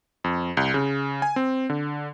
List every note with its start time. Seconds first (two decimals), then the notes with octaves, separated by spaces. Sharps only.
0.24 F2
0.57 C2
0.74 C#3
1.22 G#5
1.36 C4
1.70 D3